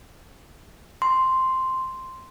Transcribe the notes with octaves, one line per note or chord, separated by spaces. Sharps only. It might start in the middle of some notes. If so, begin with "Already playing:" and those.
C6